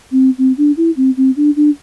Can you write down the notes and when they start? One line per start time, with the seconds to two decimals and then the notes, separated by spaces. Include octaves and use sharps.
0.12 C4
0.38 C4
0.58 D4
0.77 E4
0.97 C4
1.17 C4
1.37 D4
1.56 D4